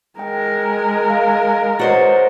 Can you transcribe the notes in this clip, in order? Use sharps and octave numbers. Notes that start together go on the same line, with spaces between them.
G#3 A#4 G5
F5
F#4 C5 C#5 D#5 A6